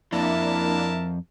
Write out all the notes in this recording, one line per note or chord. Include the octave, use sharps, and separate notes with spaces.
F2 A#3 D4 E4 A#4 E5 A5